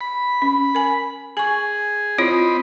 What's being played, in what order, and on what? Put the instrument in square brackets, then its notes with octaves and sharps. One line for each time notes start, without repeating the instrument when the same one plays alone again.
[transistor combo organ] B5
[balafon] C#4
A#4 G#5
[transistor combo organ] G#4 [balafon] G#5 C#6
[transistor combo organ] C4 D#5 B5 [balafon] E4 F4 C#5